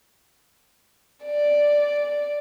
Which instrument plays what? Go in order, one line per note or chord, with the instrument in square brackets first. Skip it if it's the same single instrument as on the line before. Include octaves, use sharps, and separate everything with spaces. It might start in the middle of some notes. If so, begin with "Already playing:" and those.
[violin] D5